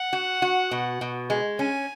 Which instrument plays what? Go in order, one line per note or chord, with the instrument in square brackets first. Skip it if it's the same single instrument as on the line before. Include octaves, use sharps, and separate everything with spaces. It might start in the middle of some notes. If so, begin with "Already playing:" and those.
Already playing: [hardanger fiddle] F#5
[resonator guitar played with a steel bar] F#4
F#4
B2
B2
G#3
[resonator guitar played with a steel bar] C#4 [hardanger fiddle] G#5